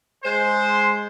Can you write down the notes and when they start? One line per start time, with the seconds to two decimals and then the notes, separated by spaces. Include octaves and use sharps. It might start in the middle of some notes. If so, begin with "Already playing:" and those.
0.23 G#3 C5